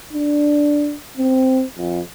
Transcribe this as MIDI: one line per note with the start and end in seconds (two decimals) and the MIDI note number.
0.13 0.96 62
1.17 1.64 60
1.78 2.00 41